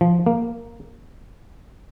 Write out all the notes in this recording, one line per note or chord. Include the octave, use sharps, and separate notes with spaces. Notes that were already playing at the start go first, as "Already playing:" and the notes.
F3
A#3